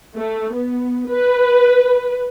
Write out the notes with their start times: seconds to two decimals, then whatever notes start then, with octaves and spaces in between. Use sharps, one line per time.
0.16 A3
0.55 B3
1.08 B4